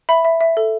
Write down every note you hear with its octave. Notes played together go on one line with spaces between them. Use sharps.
E5 B5
E5
E5
A4